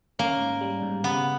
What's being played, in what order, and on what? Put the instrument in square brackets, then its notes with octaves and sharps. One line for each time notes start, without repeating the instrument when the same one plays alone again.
[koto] A#3 [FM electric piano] C#4
[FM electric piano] G#2
G3
G#2
[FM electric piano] C#3 [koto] B3